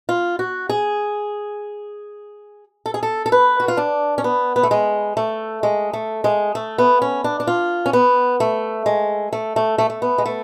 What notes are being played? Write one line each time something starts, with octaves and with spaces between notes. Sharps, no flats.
F4
F#4
G#4
A4
G#4
A4
A4
B4
F#4
F4
D4
C#4
B3
B3
A3
G#3
A3
G#3
A3
G#3
A3
B3
C#4
D4
D4
F4
C#4
B3
A3
G#3
A3
A3
A3
A3
B3
G#3
A3